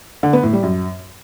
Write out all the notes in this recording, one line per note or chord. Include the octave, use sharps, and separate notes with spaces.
D3
B3
A2
G3
F#2